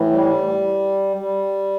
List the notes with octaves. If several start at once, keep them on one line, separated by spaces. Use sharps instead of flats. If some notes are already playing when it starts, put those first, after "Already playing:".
Already playing: A2 E3
G3
G3